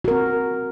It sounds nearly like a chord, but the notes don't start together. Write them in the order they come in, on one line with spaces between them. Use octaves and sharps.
F#4 A#4 C4